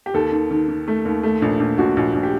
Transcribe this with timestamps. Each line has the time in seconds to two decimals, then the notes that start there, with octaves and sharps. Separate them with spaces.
0.06 G4
0.14 D#2 A4
0.32 D#3
0.51 D#3
0.68 D#3
0.88 A3
1.05 D#2
1.23 A3
1.42 A#1
1.60 A#1
1.78 A#1 F#4
1.97 A#1
2.14 A#1
2.23 G4